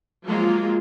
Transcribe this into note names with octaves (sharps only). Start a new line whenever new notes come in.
F3 F#3 G#3 A#3 F4